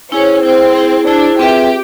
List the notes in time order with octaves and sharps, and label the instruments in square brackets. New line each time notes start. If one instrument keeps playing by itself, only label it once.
[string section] C#4 [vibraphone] E4 G#4 C5
[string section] C4 [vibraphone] E4 G#4 C5
[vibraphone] E4 G#4 C5
[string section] D4 [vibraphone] E4 G#4 C5
[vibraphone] C4 F4 G#4 B4 E5 [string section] G4